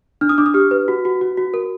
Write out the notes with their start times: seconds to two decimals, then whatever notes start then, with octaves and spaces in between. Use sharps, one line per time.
0.21 D4 F6
0.29 D#6
0.38 D4 D6
0.46 D#6
0.54 G4 F6
0.71 B4
0.88 F#4
1.05 F#4
1.21 F#4
1.37 F#4
1.54 A#4